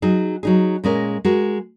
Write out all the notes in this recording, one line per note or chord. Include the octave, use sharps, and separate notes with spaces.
F#3 D#4 G#4
F#3 D#4 G#4
A#2 G#3 C#4 A#4
G#3 F#4 A#4